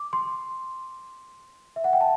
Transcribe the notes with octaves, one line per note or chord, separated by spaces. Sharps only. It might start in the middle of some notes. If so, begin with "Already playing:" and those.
Already playing: D6
C6
E5
F#5
G5
A5